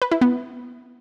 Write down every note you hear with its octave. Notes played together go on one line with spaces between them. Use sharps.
B4
E4
B3